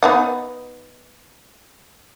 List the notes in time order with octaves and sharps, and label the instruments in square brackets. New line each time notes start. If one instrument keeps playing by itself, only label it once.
[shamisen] B3 D#4 F#5